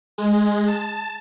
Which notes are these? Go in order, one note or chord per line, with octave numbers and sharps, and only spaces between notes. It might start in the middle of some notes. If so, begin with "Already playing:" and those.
G#3
A5